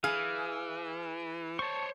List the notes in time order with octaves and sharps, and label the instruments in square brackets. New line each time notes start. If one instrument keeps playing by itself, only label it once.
[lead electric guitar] E3 [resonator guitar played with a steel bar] G#4 [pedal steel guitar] F5
[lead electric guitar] C5 C#5 [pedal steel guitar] A5 C#6